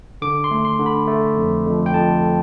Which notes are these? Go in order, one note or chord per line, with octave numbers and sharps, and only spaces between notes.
D3 D6
C6
A3
C6
D3
B5
A3
F2
F2
G5
F2 A5